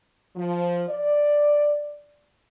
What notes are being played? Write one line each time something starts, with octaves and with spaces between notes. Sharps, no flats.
F3
D5